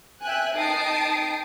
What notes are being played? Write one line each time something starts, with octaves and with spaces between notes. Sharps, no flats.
E5 G5 G#5 F#6
D#4 G5 A5 D#6 C7 D7